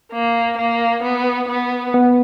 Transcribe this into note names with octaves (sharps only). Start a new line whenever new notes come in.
A#3
A#3
B3
B3
B3